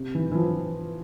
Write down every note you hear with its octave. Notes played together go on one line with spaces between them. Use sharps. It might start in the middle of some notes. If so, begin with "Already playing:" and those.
Already playing: C3
E3
E3
F3